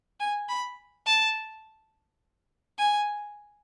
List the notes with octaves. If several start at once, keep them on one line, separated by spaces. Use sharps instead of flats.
G#5
B5
A5
G#5